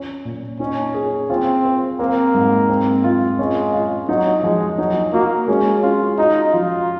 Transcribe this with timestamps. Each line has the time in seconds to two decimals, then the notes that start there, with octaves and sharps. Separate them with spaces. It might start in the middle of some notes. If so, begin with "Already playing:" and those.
Already playing: C#4 F4
0.25 A#2
0.60 C#4 D#4
0.94 G#4
1.30 C4 F4
1.65 C5
1.99 A#3 C4
2.34 G#2
2.69 C4
3.04 F4
3.39 G#3 C#4
3.73 F4
4.09 F#3 D#4
4.43 F3 G#3
4.78 F#3 D#4
5.13 A#3 F#4
5.48 G#3 C#4
5.83 C#4 F4
6.18 D#4 F#4
6.53 F3 F4